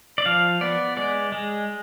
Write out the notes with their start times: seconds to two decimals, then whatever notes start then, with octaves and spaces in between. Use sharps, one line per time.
0.18 D5
0.26 F3 F5
0.61 B3 D5
0.97 G#3 D5
1.32 G#3